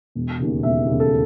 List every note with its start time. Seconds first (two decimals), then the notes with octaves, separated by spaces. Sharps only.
0.15 E1
0.39 D#2 C#3
0.63 E1 E5
0.86 D#2 C#3
1.00 A4